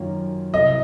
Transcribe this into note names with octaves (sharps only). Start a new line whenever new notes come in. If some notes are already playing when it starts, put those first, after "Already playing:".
Already playing: F#2 D#3 A#3 C#4 F4
C2 C3 F#3 D#5